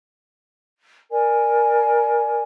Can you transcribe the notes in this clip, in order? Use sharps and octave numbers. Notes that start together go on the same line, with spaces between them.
A#4 D5 G#5